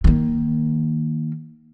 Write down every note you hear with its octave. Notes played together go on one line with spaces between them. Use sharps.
D#3 A#3